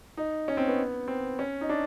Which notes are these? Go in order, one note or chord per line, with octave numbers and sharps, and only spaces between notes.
D#4
C#4
C4
B3
C4
C#4
D#4
D4